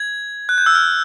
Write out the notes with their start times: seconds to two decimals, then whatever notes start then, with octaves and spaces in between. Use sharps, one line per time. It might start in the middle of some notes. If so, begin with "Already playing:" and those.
Already playing: G#6
0.49 F#6
0.58 G6
0.66 E6
0.75 F6